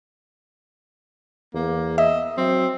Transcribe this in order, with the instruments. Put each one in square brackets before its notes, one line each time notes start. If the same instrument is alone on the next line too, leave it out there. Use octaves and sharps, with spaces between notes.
[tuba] E2 [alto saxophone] A#3
[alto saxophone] D#5 [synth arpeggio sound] E5
[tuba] F#3 [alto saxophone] C4